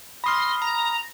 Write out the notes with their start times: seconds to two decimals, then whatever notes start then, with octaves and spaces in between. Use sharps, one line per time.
0.24 B5 C6 D#6 F6 A#6
0.62 A#5